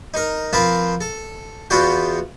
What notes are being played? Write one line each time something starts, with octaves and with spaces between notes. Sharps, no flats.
D#4 A#4
F3 C4 F4 A#4 B4
A4
E2 B3 F4 F#4 G5